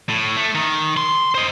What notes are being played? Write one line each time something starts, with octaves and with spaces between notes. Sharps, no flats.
A2
A3
D#3
C6
C5 D#5